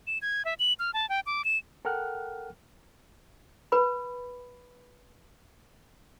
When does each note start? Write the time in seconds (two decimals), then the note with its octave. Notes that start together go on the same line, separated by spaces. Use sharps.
0.07 E7
0.22 G#6
0.45 E5
0.59 F#7
0.79 F6
0.94 A5
1.09 G5
1.26 D6
1.45 E7
1.85 A4 A#4 F#5 G5 F6 F#6
3.72 B4 B5